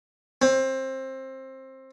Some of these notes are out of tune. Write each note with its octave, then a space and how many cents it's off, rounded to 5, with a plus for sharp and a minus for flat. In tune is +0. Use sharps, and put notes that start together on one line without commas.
C4 +20